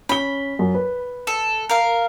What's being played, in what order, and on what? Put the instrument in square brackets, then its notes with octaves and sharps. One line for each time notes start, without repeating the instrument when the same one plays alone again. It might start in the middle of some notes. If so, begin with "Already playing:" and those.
[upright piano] C#4 G7 [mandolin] B5
[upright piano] F#2
B4
[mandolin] A4
A#4 F5